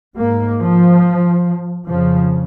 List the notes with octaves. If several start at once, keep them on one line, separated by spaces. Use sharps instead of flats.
G#2 A#3
F3
F2 C#3 F3